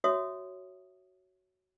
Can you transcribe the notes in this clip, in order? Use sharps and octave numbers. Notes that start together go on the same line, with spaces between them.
F#4 C#5 E5 D#6